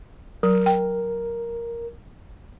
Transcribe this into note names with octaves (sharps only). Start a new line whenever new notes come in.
F#3 A#4
G5